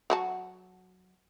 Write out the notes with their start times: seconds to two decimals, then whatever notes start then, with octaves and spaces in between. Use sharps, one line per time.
0.10 F#3 F#4 A5